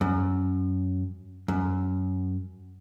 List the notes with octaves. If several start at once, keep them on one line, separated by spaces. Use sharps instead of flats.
F#2
F#2